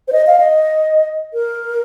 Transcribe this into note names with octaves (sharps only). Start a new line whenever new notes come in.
C5
D#5
F5
D#5
A#4